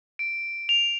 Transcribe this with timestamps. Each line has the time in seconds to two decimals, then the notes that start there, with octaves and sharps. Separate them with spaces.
0.19 D7
0.69 F7